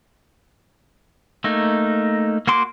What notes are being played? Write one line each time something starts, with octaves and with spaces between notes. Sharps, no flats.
A3 A#3 D#4
A#3 F#4 C6 D6